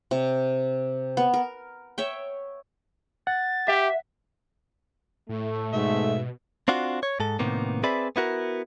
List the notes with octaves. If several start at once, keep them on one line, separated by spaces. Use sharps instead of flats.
C3
B3
A#4
C#5 E5 G5
F#5 A6
G4 E5
A2 A3
G#2 B2 E5
C4 D4 F4 F#4
C#5
G#2 A4
A2 C3 D#3 A#3 B3
C4 G#4 B4 D5 E5 B5
B3 E4 F#4 A#4